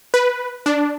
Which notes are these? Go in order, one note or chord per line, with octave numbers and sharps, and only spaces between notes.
B4
D4